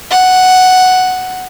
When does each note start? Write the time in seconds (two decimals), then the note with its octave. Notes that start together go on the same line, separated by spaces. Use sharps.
0.11 F#5